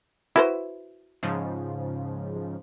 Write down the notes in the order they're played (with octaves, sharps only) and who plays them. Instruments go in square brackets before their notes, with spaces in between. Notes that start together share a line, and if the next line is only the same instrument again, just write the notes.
[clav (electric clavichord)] E4 [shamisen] F#4 B4 C5
[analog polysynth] G#2 C#3 F3